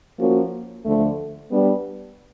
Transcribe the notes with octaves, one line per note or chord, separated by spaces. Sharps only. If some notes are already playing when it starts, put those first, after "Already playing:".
F3 A#3 C#4 F#4
D2 D3 F3 A3
G3 B3 D4